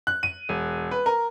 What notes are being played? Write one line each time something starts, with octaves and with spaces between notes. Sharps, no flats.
F#6
D#7
E1
B4
A#4